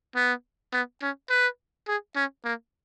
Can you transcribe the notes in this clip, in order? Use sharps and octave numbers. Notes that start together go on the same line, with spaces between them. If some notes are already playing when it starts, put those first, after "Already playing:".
B3
B3
C#4
B4
G#4
C#4
A#3